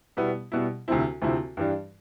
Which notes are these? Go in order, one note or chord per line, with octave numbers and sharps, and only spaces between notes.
B2 G3 B3 E4
B2 G3 B3 E4
D2 C3 F3 C4 E4
D2 C3 F3 C4 E4
G2 E3 G3 D4